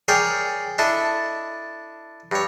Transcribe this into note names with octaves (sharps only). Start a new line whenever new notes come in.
G#4 A#4 C#5 D5 G5
D4 E4 A4 D#5
G2 C#5